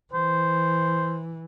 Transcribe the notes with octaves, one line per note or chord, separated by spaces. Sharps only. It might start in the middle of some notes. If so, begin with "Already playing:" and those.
E3 C5